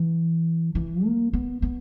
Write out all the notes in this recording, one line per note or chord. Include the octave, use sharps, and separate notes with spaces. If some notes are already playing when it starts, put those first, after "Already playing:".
Already playing: E3
E3
A#3
B3
B3